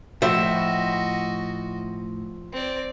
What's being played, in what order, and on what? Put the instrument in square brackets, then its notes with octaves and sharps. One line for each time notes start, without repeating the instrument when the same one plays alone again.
[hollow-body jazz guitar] A2 [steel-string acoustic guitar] F3 E5 [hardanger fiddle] F#4 D#5
[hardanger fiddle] C4 D5